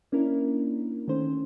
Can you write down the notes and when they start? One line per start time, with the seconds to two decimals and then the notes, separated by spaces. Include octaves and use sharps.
0.12 A#3 C#4 D4 E4 A#4
1.08 D#3 A3 C#4 C5